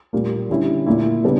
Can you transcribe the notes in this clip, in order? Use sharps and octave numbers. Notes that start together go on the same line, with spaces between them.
A#2 G3 A#3
D3 G3 C#4 E4
A#2 A#3 E4
C#3 G3 B3 D4